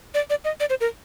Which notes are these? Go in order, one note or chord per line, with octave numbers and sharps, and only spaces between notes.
D5
D5
D#5
D5
C5
A#4